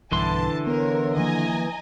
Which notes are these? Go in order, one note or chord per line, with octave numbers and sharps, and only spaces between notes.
B1 G2 D3 E3 A5 C6
B3 A#4 C#5
D#3 F3 A#3 D#5 G#5 A#5